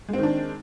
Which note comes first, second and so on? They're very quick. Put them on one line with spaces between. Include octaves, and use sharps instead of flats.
G#3 C4 D#3 D4